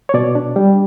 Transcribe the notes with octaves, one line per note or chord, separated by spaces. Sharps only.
C#5
B2 D5
D4
G3